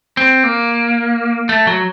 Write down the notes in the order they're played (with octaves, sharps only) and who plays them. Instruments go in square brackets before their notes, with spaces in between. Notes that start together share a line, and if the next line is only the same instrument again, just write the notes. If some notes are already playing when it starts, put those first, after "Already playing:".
[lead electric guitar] C4
A#3
A3
F#3